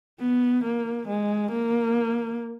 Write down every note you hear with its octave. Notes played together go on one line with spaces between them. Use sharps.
B3
A#3
G#3
A#3